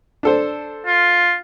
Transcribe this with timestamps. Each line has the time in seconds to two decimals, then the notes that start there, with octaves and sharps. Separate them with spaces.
0.23 D4 A4 C5
0.86 F4